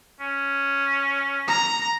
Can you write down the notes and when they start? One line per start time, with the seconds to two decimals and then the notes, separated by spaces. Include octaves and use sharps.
0.20 C#4
1.48 A#5